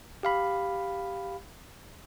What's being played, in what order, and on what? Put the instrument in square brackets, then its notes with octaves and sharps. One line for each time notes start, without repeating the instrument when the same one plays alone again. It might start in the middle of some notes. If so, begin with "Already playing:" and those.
[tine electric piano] G4 F5 B5